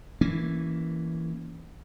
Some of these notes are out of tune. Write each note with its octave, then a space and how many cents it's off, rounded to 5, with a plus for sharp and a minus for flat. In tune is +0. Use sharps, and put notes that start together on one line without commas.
E3 +0 A#3 +0 C#4 +0